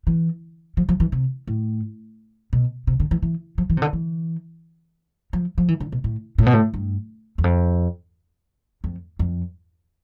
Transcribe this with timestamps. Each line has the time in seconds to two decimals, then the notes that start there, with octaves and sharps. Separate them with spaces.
0.07 E3
0.77 F3
0.89 F3
1.00 E3
1.12 C3
1.47 A2
2.53 B2
2.87 C3
3.00 D3
3.11 E3
3.22 E3
3.58 F3
3.70 E3
3.77 C3
3.82 D3
3.93 E3
5.33 F3
5.58 F3
5.68 E3
5.80 D3
5.92 B2
6.04 A2
6.38 A2
6.46 B2
6.53 A2
6.74 G2
7.38 E2
7.44 F2
8.84 F2
9.19 F2